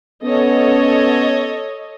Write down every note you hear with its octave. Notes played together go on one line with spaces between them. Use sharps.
B3 C#4 A4 C#5 D#5